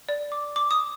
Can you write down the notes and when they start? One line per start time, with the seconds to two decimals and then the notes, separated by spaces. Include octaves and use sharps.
0.09 D5
0.32 D6
0.56 D6
0.71 D#6